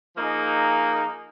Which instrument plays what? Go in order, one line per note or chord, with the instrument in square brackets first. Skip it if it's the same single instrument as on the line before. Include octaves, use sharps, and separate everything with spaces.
[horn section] F3 A#3 D#4 G#4